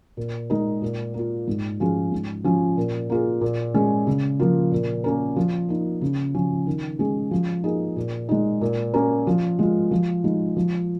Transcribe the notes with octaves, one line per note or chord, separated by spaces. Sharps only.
A#2
G#3 D#4 A#4
A#2
A#3 F4
G#2
F3 C#4 F4 G#4
G#2
F3 C#4 F4
A#2
A#3 F4 G#4
A#2
G#3 C#4 G#4
C#3
F3 A#3 F4
A#2
A#3 C#4 A#4
F3
A#3 D#4
C#3
F3 C#4
D#3
G#3 C#4 G#4
F3
A#3 D#4 G#4
A#2
G#3 D#4
A#2
A#3 C#4 A#4
F3
G#3 F4
F3
G#3 D#4
F3